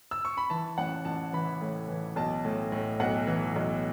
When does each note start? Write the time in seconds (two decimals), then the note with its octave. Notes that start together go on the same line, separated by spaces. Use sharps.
0.11 E6
0.25 C#6
0.37 B5
0.50 E3 A5
0.78 A1 F#5
1.05 A1 A5
1.33 E3 B5
1.61 A2
1.88 E3
2.16 B1 A5
2.45 A2
2.72 A2
3.00 B1 F#5
3.27 E3
3.56 B1